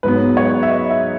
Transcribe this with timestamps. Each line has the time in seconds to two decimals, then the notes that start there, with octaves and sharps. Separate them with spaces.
0.03 G#2 F#3 B3 B4
0.37 C#5
0.63 E5
0.69 D#5
0.90 E5